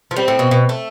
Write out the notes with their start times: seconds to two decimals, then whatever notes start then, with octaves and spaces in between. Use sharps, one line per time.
0.11 F3
0.16 G3 C4
0.28 A2
0.39 B2
0.51 B2
0.69 A3